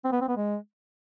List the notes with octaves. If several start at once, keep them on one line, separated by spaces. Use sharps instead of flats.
C4
B3
C4
B3
G#3